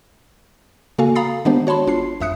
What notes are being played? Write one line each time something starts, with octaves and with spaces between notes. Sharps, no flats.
C#3 A#3 F#4 A4 F5 G#5
F5 A#5 B5 D#6 A6 C7
D#3 G#3 B3 D4 G4 C5
F#4 C#5 A5 B5 C6
G1 D4 F4 C7
G#1 F#2 E5 D#6 F#6 C#7